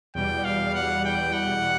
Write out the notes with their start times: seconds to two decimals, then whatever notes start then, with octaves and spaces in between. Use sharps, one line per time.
0.15 E2 B2 G3 G5
0.45 F5
0.75 F#5
1.05 G5
1.33 F#5